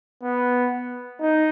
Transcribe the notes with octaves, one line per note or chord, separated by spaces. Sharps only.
B3
D#4